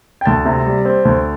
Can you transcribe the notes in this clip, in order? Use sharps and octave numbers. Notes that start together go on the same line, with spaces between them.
G5
D2 A5
C3
G3
C4
D2